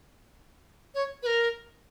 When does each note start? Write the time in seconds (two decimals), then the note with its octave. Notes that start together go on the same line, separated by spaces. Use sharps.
0.95 C#5
1.23 B4
1.26 A#4